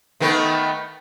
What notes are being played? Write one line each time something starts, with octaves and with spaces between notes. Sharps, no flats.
D#3 A3 B3